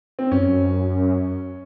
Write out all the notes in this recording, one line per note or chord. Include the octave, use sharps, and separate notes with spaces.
C4
F#2 C#4